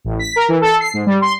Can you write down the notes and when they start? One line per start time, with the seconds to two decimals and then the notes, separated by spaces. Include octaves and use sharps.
0.05 A1
0.19 B6
0.36 A#4
0.48 E3
0.61 A4
0.80 C7
0.94 G#2
1.06 G3
1.21 C6